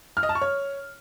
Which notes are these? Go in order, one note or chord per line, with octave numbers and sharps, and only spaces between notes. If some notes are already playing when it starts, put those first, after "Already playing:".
F6
D#5
A5
C#6
C#5